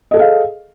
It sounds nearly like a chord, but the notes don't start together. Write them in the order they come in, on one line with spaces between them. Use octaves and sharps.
D#5 A4 G#4 F5